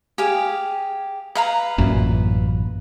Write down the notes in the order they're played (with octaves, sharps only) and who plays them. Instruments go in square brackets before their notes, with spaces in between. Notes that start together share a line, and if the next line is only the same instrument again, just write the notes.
[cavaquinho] G4 G#4 F5
B4 F5 A#5
[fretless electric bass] A1 F#2 A#2